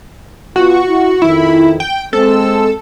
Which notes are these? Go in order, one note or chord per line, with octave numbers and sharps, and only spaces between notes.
B2 F4 F#4
E4
F2 D#3 E4
G5
G#3 C4 A4